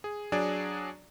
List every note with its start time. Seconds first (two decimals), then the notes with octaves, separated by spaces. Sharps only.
0.04 G#4
0.32 F#3 D4 G#4 D5